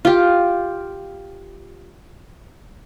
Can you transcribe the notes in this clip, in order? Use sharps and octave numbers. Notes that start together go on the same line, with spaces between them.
F4 G4